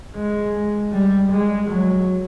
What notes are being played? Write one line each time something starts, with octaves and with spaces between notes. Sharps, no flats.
G#3
G3
G#3
F#3